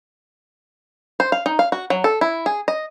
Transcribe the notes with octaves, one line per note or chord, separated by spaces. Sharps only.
C5
F5
D#4
F5
F#4
F#3
A4
E4
G#4
D#5